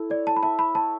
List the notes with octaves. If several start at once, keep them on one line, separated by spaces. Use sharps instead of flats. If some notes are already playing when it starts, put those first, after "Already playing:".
Already playing: E4 A4
C#5 D5
A5
B5
E5 A5
B5
C#5 A5